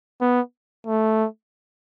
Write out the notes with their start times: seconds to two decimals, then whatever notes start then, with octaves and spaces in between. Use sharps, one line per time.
0.21 B3
0.86 A3